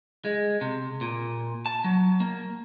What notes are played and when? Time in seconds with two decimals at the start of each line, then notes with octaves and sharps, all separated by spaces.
0.25 G#3
0.61 C3
1.01 A#2
1.66 A5
1.84 F#3
2.20 A#3